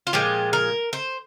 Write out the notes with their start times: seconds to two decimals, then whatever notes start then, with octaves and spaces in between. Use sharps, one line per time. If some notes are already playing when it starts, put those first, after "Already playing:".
0.07 F4
0.13 A#2 F3 G#3 G4
0.53 A#4
0.93 C5